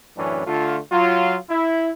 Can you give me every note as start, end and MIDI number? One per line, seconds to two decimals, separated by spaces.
0.17 0.47 42
0.17 0.47 45
0.17 0.47 52
0.17 0.47 61
0.17 0.47 62
0.47 0.77 50
0.47 0.77 57
0.47 0.77 65
0.92 1.36 54
0.92 1.36 65
1.50 1.90 64